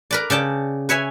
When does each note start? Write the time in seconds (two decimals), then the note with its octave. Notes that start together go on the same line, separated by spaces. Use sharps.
0.11 A#4 B4 D5
0.30 C#3 D5 G5 A5
0.89 B4 C#5 E5 G#5